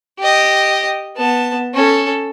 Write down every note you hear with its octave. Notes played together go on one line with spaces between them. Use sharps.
G4 D#5
B3 A5
C#4 A4